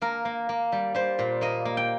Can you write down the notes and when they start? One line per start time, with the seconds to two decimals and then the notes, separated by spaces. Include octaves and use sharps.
0.02 A#3 A#4
0.25 A#3
0.49 A#3
0.72 G3
0.95 G3 C5
1.19 A#2
1.41 A#3 D#5
1.65 A#3
1.77 G5